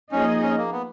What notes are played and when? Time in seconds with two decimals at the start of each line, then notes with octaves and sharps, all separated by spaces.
0.12 F3 A#3 C#4 D#4 G#4 D#5
0.42 C#4
0.57 A#3
0.72 B3